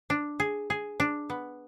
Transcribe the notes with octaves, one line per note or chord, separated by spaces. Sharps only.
D4
G#4
G#4
D4
B3